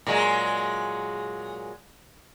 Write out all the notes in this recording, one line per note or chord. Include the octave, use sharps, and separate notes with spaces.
A#2 F#3 G#3